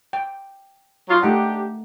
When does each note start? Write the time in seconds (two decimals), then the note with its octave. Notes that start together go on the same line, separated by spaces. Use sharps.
0.13 G5
1.09 F#3 D#4 F4
1.22 A3 D4 D#4 G4 F#5